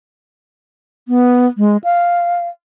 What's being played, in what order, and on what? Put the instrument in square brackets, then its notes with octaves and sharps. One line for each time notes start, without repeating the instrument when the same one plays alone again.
[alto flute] B3
G#3
F5